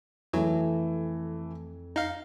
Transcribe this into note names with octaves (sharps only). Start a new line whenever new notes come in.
F2 E3 F#3 A3
D#4 F5